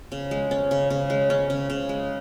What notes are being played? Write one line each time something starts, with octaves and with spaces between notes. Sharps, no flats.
C#3
G#3
C#4
C#3
C#3
G#3
C#4
C#3
C#3
G#3